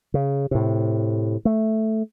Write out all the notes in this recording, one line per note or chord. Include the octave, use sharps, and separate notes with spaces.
C#3
A2 C3
A3